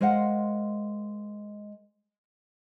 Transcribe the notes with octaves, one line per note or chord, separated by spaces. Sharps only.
G#3 A#4 C5 F5 F#5